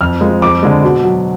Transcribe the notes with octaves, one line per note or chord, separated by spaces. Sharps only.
F2 F6
F3 G#3
F2 D6
D3 G#3
B2
F#3